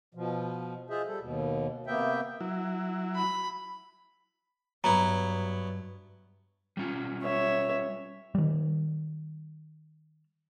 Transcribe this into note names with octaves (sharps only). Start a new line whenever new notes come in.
B2 F3
F4 G#4 C5 D#5 E5
G3 A4
D#2 B2
C3 A#3 B3 E5 G5
F#3 E4
B5
G2 F#3 B3 E4 A#5
G3 C#4 F4
C#5 E5
D#3 G3